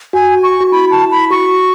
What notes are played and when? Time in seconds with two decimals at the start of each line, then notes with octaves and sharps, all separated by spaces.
0.13 F#4 G#5
0.43 C#6
0.61 F#4
0.72 E4 B5
0.91 A5
1.01 E4
1.11 B5
1.31 F#4 C#6